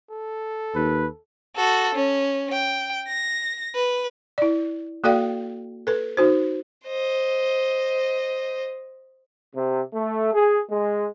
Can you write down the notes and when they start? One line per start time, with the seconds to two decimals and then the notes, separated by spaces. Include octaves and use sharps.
0.11 A4
0.75 D#2 B4
1.56 F#4 A4
1.95 C#4
2.52 G5
3.08 A#6
3.75 B4
4.38 E4 D5
5.04 A#3 F#4 A4 D5 F5 G5
5.87 A4 B4
6.17 D#4 F#4 C5
6.86 C5 D#5
9.55 C3
9.94 A3
10.34 G#4
10.70 G#3